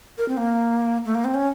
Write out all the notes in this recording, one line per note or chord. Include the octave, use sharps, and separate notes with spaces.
A#4
C4
A#3
A3
A#3
C4
C#4